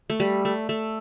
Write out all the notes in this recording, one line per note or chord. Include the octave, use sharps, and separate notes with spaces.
A3
G3
A3
A3